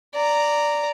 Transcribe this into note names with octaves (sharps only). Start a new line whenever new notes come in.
D5 A#5